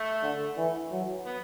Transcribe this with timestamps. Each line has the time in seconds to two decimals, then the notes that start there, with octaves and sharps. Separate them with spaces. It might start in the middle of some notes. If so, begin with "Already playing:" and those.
Already playing: A3
0.23 D3
0.57 E3
0.92 F#3
1.26 B3